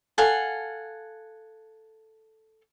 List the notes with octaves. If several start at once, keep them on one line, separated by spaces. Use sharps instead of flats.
A4 F5 F#5 G#5